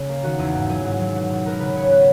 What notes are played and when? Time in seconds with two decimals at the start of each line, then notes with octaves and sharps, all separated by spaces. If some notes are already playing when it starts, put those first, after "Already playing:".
Already playing: C#3 C#4 G#4
0.09 A#3
0.23 D#3 F#4
0.39 E2 G#4
0.55 G#2
0.69 F#3 G#4
0.85 G#2
1.00 F#3
1.16 B2
1.30 B2
1.46 B3 A#4
1.60 C#3 B4
1.76 C#3 C#5
1.91 B3 B4